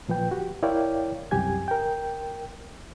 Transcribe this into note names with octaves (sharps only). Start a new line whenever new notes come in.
A#2 F3 B4 G5
F#4 G4
E4 A#4 C#5 D5 F5 G5
C2 F#2 G4 G#5 G#6
A#4 G5